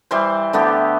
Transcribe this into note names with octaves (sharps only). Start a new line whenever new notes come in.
E3 G3 C5
D3 A3 B3 G4